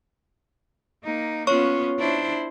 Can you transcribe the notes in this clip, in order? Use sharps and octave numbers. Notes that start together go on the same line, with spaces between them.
A#3 D#4
B3 C#4 F4 C#5 C#6
D4 E4 C5